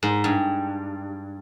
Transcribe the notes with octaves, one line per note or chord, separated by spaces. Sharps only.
G#2
G2